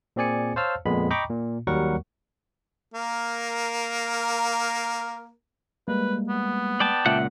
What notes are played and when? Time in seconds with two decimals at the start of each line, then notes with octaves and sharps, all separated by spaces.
0.16 A#2 C4 G#4 D5 G#5 C#7
0.56 C5 C#5 F5 A5 E6 F6
0.86 F2 A#2 G#3 B3 B5
1.10 D#5 G5 A#5 B5 C#6 D6
1.30 A#2
1.67 D#2 F#3 G3 A#4 F#5 C#6
2.94 A#3 A#4
5.88 G3 G#3 A#3 B4
6.29 B3
6.80 D5 G5 A5
7.06 C#2 A#2 E5 F#5